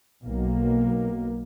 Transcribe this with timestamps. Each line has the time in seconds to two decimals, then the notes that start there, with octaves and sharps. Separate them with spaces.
0.24 B1 A#3